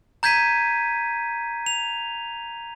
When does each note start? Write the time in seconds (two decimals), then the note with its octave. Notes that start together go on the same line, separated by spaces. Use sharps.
0.23 A#5 G6 G#6 B6 D#7
1.66 F7